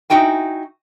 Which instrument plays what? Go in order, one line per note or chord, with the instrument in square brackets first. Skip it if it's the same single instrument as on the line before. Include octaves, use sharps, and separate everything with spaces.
[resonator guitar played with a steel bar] D#4 E4 F#4 G5 G#5